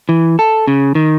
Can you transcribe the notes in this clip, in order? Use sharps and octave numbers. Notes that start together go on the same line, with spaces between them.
E3
A4
C#3
D#3